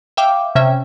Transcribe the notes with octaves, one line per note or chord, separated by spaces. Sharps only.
E5 F5 G5 D6
C3 C#4 E5 G5